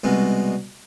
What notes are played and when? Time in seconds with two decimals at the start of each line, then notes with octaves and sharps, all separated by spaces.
0.04 C2 B2 G#3